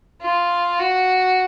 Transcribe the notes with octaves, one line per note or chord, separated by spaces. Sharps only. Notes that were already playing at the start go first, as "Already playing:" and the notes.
F4
F#4